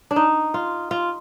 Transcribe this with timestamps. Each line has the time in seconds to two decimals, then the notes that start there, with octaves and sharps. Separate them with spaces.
0.11 D4
0.16 D#4
0.54 F4
0.91 F4